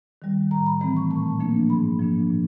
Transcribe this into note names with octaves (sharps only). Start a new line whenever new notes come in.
D#3 G3
A2 A#5
B5
E3 A3 C4 B5
C#6
A#2 A5
F3 A#3 D4
G#2 B5
F3 A#3 D4
A#2